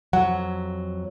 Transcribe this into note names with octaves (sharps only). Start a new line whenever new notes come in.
F2 F#3 F#5